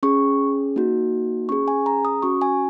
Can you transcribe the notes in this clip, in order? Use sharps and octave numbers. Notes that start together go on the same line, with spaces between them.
C#4 G#4 C#6
A#3 D#4 F#4
C#4 G#4 C#6
G#5
A#5
D#6
C#4 F#4 C#6
G#5